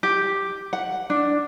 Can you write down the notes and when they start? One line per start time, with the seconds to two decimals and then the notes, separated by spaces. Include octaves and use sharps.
0.03 G4
0.73 F#5
1.10 D4